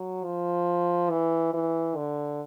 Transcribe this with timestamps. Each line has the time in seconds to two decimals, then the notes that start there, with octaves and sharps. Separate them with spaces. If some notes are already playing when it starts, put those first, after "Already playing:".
Already playing: F#3
0.24 F3
1.10 E3
1.53 E3
1.97 D3